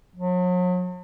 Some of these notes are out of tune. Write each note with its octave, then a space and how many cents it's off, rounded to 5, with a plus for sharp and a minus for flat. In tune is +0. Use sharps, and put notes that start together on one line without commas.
F#3 -40